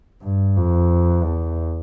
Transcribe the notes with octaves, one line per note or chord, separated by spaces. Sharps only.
G2
F2
E2